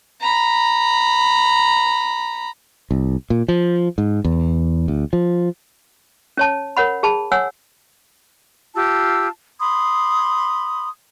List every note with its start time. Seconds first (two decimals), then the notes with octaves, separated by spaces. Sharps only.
0.22 A#5 B5
2.91 C2
3.30 A#2
3.48 F3
3.98 G#2
4.24 E2
4.88 D2
5.13 F3
6.37 C#4 C#5 A5
6.77 A#4 C#5 F#5 B5
7.03 G#4 A5 B5
7.32 C#5 F#5 G#5 E6
8.75 F4 G4 A5 E6
9.61 B5 C6 D#6